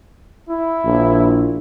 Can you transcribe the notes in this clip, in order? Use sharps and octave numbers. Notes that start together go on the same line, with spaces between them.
E4
A#1